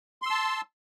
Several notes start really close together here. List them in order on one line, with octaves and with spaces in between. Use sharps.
C6 E6 A5